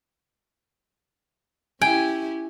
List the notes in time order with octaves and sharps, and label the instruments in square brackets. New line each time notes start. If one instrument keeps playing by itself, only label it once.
[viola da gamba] C#4 E4 G4 [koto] G5 [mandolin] G#5